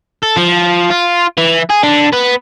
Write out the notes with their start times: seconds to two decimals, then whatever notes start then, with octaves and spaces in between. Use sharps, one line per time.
0.23 A4
0.36 F3
0.91 F4
1.38 E3
1.70 G#4
1.83 D3
2.13 B3